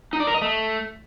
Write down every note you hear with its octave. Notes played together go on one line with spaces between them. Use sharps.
D#4
D5
A#4
D#5
A3